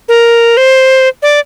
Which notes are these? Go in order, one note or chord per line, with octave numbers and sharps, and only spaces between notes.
A#4
C5
D5